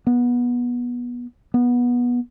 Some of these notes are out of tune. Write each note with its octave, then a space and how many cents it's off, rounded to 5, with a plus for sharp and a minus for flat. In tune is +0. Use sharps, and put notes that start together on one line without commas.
B3 -20
B3 -20